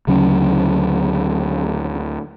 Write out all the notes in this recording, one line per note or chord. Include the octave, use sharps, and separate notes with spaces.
D2 C#3 F#3 C#4